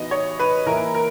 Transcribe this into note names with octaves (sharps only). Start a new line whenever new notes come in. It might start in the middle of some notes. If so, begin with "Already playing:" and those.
Already playing: E3 B3 D#4 F#4 D#5
C#5
B4
E3 A#3 E4 A#4
A#4